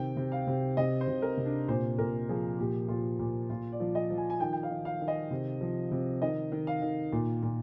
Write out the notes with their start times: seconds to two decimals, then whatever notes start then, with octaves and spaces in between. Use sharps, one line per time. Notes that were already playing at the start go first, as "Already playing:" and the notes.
Already playing: C3 D#3 G5
0.17 C3
0.32 F5
0.47 C3
0.77 C3 D#5
1.01 C5
1.08 C3
1.22 A#4
1.37 C3
1.45 D4
1.68 A#2 C5
1.98 A#2 A#4
2.29 F3 G#4
2.59 A#2 G4
2.88 A#2 F4
3.19 A#2
3.50 A#2 F4
3.72 D5
3.80 F3
3.95 D#5
4.11 F3
4.18 G#5
4.30 G#5
4.40 D#3 G5
4.53 G5
4.63 F5
4.71 D#3
4.85 F5
5.01 D#3
5.08 D#5
5.31 C3
5.61 F3
5.91 C3
6.21 D#3 D#5
6.52 D#3
6.67 F5
6.82 D#3
7.13 A#2
7.43 A#2